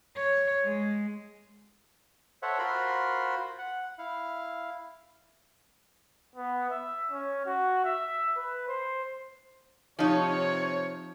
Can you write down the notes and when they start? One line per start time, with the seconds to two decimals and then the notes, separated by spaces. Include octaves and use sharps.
0.17 C#5
0.64 G#3
2.42 A4 C5 C#5 E5 F#5
2.59 F4 F#4 A#4 C5 B5 C6
3.58 F#5
3.98 E4 F5
6.36 B3
6.71 E5
7.11 C#4
7.46 F#4
7.85 E5
8.37 B4
8.68 C5
9.99 C3 F3 D#4 C#5